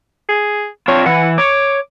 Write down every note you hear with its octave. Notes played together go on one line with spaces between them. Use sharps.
G#4
C4 D4 F4 C#5
E3 F#5
C#5 D6